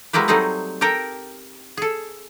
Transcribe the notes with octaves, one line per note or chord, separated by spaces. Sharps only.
F#3 G#3 A#3 E4 G4 B4
F#3 G3 A3 C4 D#4 G#4
G4 A4 A#4 G5
G#4 A4